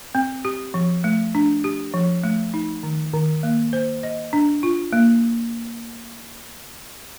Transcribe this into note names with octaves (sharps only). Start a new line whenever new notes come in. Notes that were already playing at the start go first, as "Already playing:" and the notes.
C4
G4
F3
A3
D4
G4
F3
A3
D#4
D#3
D#3
A#3
C5
D#5
D4
F4
A#3